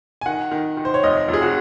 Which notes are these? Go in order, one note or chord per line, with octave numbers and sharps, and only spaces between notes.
G#5
D#3 F#5
D#3
D#3
C5
C#5
F1 D#5
F2 G#4
F#4